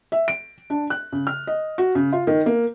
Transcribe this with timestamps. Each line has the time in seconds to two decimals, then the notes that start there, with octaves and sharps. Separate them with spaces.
0.12 E5
0.28 D7
0.70 D4
0.90 F#6
1.12 C#3
1.27 F6
1.47 D#5
1.78 F#4
1.95 C#3
2.13 F4
2.27 D#3
2.46 A#3